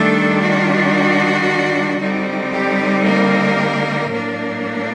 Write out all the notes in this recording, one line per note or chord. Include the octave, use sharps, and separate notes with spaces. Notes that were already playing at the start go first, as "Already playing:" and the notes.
Already playing: D#3 G3 A3 D4 A4
F#4
D3 G3 C4 D#4
G4
A#3 A#4
A2 F#3 A#3 D4